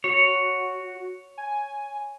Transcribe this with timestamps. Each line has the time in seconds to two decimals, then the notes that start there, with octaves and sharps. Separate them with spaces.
0.04 F#4 C#5
1.38 G#5